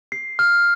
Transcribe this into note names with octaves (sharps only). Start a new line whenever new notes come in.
C7
F6